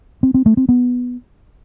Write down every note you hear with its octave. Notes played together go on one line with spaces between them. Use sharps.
C4
C4
A3
C4
B3